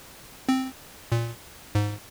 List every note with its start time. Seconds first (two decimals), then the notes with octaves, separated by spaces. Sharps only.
0.49 C4
1.12 A#2
1.75 G#2